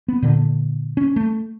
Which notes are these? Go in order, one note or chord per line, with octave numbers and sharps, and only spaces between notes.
B3
A#2 D3
C#4
A3